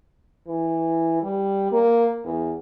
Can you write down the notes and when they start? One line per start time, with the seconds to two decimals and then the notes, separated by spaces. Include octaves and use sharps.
0.47 E3
1.23 G3
1.72 A#3
2.25 E2